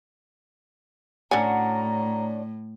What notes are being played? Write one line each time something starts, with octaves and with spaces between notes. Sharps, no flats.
A2 D3 C#4 D4 F#4 G#5 A#5